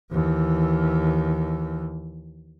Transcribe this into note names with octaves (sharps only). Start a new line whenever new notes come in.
D#2 E3